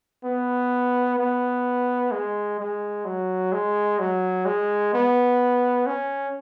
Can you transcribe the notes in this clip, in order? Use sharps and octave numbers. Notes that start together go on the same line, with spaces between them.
B3
B3
G#3
G#3
F#3
G#3
F#3
G#3
B3
C#4